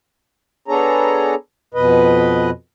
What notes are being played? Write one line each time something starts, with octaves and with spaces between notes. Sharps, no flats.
B3 D4 G#4 A4 C#5 A#5
F2 B2 B4 D#5